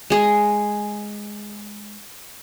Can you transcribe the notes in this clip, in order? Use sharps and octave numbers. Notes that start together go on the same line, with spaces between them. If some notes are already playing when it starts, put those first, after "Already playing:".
G#3 G#4